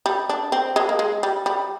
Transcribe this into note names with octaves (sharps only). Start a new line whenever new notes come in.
G3
D4
C4
G#3
A#3
G#3
G3
G3